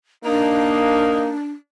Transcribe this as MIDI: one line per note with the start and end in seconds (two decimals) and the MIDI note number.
0.24 1.33 58
0.24 1.50 62
0.24 1.33 63